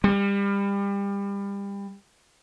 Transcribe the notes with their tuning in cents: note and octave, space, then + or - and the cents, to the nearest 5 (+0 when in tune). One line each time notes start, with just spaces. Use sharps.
G3 +30